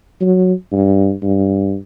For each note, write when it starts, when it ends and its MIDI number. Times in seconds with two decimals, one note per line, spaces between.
0.21 0.53 54
0.73 1.14 43
1.23 1.76 43